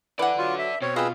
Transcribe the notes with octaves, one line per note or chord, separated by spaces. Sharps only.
E3 A4 B4 D5 F#5
F#3 F4
E5
B2 C4 C#5
C4 F4 G#4 B4 D#5 E6